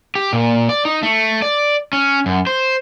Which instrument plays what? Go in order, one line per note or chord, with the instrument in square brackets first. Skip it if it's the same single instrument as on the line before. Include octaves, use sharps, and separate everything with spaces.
[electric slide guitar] G4
A#2
D5
D#4
A3
D5
C#4
F#2
C5